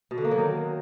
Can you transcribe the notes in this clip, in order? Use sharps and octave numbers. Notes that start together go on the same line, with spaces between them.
B2
D3
A#3
F#3
D#3